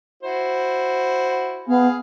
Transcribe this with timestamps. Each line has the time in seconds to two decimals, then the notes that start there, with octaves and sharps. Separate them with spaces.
0.23 E4 F#4 C5
1.68 B3 G#4 F5